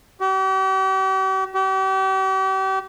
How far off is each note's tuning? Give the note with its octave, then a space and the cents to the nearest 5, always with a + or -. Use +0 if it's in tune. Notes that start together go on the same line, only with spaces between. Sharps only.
G4 -45
G4 -40